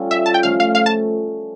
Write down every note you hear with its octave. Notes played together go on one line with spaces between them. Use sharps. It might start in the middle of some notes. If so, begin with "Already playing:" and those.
Already playing: G3 C#4 F4 A4
E5
A5
G5
F3 A3 C#4 F5
F5
F5
A5